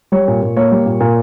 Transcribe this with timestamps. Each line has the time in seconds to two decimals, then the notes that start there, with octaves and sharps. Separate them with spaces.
0.12 G3 C#5
0.28 A#2
0.42 A#2
0.56 A#3 C#5
0.72 G3
0.86 A#2
1.00 A#2